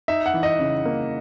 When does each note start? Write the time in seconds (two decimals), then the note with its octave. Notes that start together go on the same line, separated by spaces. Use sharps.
0.08 D#4 E5
0.26 F#5
0.34 E3
0.43 D#5
0.59 C#3
0.85 A#3